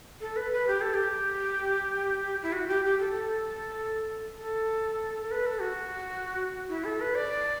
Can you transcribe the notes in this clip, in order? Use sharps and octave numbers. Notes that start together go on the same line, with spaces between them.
A4
B4
B4
G4
A4
G4
E4
F#4
G4
G4
A4
A4
A4
B4
A4
F#4
E4
A4
B4
D5